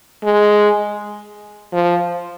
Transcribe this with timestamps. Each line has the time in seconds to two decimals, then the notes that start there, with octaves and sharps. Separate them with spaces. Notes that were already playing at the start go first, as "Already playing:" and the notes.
0.24 G#3
1.73 F3